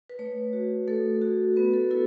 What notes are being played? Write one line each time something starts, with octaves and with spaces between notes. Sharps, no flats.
B4
A3 C#5
F#4
A3 A4
F#4
B3 B4
A4
E4 A4